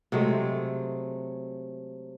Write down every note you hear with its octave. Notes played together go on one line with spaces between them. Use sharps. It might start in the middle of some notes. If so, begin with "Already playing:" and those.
C3 F#3 G#3 A3